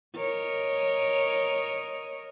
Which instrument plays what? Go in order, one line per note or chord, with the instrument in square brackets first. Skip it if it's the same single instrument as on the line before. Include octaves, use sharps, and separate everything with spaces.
[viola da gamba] A#4 C#5 D#5